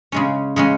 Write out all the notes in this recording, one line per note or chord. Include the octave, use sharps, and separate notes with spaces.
C#3 G#3 C#4
C#3 G#3 C#4